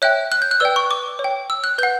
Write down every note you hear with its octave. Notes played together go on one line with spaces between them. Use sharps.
C#5 E5 G5 F#6
F#6
G6
F#6
B4 D5 G5 E6
C#6
D6
C#5
G5
E6
F#6
B4 F#5 G6